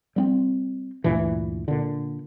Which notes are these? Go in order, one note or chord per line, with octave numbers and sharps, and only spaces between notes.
G3 B3 C4
D2 G2 A#2 E3
A#2 D3